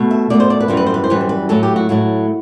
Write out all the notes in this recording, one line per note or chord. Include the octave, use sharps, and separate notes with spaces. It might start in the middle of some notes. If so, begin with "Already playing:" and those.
Already playing: B2 A3
E5
B2 A3 D5
C5
D5
B4
F#2 E3 G3 C5
B4
C5
B4
C5
F#2 E3 G3 B4
C5
B4
A2 F#3 A3 A4
G4
F#4
A2 F#3 A3 F#4